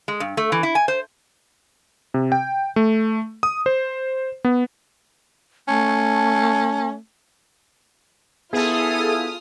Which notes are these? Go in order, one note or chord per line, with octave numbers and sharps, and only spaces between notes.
G#3
G2
A3
E3
E4
G#5
C5
C3
G5
A3
D#6
C5
B3
A3 C#4 A5
B3 E4 F4 G#4 A4 D#6 F6